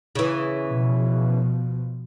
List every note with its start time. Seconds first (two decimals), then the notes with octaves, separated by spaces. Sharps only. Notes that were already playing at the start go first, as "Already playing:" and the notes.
0.15 C#3 E3
0.67 B2 F3